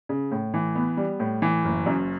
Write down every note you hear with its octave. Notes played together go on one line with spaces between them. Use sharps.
C#3
A2
E3
B3
G3
A2
E3
F#1
F#2